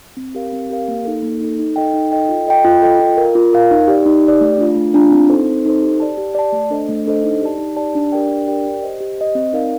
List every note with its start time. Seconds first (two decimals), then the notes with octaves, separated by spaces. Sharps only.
0.17 C4
0.35 G4 A#4 F5
0.53 C4
0.70 G4 A#4 F5
0.88 A#3
1.05 D#4 A4
1.23 A#3
1.41 D#4 A4
1.59 D#4
1.76 A4 D#5 G5
1.93 D#4
2.12 A4 D#5 G5
2.29 F4
2.47 A4 D#5 G5
2.65 F4
2.82 A4 D#5 G5
2.99 F4
3.17 A#4 F5
3.35 F4
3.53 A#4 F5
3.71 D#4
3.88 G4 D5
4.06 D#4
4.23 G4 D5
4.41 A3
4.58 D4 F4
4.76 A3
4.94 D4 F4
5.11 C4
5.29 D#4 A4 C5
5.47 C4
5.65 D#4 A4 C5
5.82 G4
6.00 D5 A5
6.18 G4
6.35 D5 A5
6.53 A3
6.70 D4 A4 C5 D#5
6.89 A3
7.06 D4 A4 C5 D#5
7.24 D#4
7.42 G4 D5 A5
7.58 D#4
7.76 G4 D5 A5
7.95 D4
8.12 G4 A#4 D5 G5
8.29 D4
8.47 G4 A#4 D5 G5
8.65 G4
8.83 C5 D#5
9.00 G4
9.18 C5 D#5
9.35 C4
9.53 D#4 A#4 D5 F5